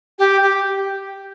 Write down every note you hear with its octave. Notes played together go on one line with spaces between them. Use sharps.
G4
G4